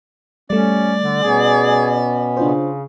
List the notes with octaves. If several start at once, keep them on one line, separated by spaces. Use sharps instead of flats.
G3 A3 C#4 D5
D3
B2 B3 C#4 G#4
C#3 D4 F4 C5